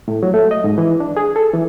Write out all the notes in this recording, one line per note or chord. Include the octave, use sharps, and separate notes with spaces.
A2
F#3
A3
D#5
G#2
E3
D4
G#4
A4
E3